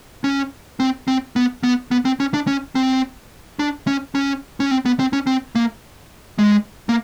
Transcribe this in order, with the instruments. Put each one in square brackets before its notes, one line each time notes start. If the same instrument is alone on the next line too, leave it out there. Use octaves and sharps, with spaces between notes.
[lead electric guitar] C#4
C4
C4
B3
B3
B3
C4
C#4
D4
C#4
C4
D4
C#4
C#4
C#4
C4
B3
C4
C#4
C4
A#3
G#3
A#3